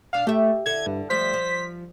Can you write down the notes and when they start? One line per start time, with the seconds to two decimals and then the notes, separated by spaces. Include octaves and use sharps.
0.13 B2 D4 F5
0.27 A3 G4 E5
0.66 D3 E4 A4 G#6
0.86 G2
1.10 F3 G3 A3 C5 B6
1.34 F3